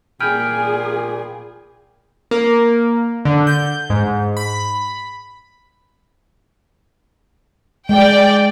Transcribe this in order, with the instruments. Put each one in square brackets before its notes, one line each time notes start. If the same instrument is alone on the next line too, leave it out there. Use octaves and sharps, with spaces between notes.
[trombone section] A#2 [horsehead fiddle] G#4 [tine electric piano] G5 G#5 B5 [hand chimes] F6
[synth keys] A#3
D3
G6
G#2
B5
[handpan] G#3 [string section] D5 G5